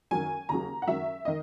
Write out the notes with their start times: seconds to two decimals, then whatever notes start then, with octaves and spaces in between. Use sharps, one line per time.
0.11 F#2 D#3 F#3 G#5
0.49 D#2 C#3 F#3 A#5
0.82 F#5
0.87 F#2 D#3 F#3 E5
1.25 D#3 D#5